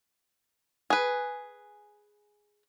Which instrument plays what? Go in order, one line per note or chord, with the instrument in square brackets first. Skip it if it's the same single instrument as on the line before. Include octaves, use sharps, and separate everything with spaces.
[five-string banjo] G#4 B4